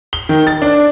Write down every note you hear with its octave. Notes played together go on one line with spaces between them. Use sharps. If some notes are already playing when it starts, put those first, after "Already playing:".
G7
D#3
A6
D4